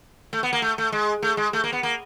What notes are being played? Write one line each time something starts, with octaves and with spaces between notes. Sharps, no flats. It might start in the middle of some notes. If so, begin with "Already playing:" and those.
A3
B3
A#3
A3
A3
G#3
A3
G#3
A3
A#3
B3
A#3